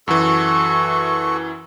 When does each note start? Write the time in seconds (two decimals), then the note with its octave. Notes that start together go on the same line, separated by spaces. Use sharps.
0.08 F#2 E3 F#4 A4 C#6